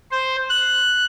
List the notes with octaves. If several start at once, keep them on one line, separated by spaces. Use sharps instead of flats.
C5
F#6